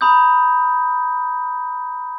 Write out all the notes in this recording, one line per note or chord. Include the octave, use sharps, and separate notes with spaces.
A#5 B5 D#6 G6